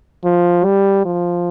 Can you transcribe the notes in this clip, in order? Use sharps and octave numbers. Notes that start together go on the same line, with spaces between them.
F3
G3
F3